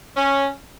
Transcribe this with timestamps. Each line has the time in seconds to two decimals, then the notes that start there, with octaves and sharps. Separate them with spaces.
0.17 C#4